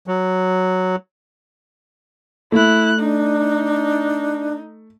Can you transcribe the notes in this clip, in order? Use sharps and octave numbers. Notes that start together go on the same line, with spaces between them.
F#3
A3 E4 F#6
D4 D#4